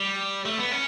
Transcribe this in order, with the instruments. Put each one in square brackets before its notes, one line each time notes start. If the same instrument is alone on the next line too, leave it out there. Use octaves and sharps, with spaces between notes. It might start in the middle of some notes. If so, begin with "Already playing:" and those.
Already playing: [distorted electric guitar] G3
A3
B3
C#4